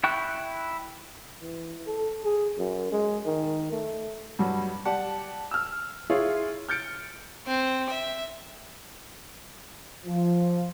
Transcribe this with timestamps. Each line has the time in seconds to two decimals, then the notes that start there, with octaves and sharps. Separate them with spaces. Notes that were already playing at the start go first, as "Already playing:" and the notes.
0.04 E4 G5 C#6 F#6
1.40 E3
1.87 A4
2.25 G#4
2.58 F#2
2.92 G#3
3.26 D#3
3.72 A3
4.39 G2 F#3 G3
4.85 G4 D5 F#5 A5
5.51 E6 F6
6.10 E4 F4 G#4 C#5 F5
6.69 F6 G6 A6 C#7 D7
7.47 C4
7.90 E5
10.06 F3